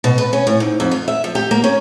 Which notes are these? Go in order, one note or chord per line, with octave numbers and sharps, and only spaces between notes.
B2
B4
C#4
A2
G#2
F2
F4
E5
F3
G4
A#3
C#4